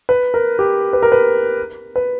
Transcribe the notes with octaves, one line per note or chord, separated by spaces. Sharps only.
B4
A#4
G4
B4
A#4
B4
B4